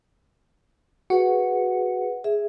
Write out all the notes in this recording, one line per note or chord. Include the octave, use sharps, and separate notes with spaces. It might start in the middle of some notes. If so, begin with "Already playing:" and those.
F#4 G#4 B4 F#5
G#4 E5